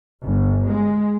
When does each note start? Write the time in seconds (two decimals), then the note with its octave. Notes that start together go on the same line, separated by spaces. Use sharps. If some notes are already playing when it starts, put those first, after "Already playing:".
0.23 G1
0.69 G#3